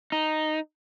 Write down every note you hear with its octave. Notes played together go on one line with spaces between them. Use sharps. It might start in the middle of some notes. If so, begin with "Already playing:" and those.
D#4